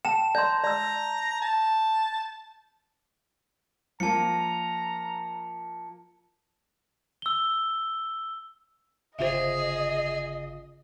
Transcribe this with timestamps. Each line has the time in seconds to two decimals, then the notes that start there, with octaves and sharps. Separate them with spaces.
0.05 G5 A5 E7
0.35 D5 A#5 C6 G6
0.64 D5 A#5 E6
1.42 A5
4.00 F3 A#3 A5 A#5 C#7
7.22 E6 G7
9.19 G1 C#3 F4 G#4 C5 D#5 E5